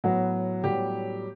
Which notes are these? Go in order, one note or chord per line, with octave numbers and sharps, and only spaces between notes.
A2 F#3 B3 F#4
A2 F#3 G3 B3 G4